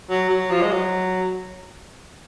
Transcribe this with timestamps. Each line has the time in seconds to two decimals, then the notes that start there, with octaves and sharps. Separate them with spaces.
0.10 F#3
0.29 F#3
0.50 F3
0.61 G#3
0.71 F#3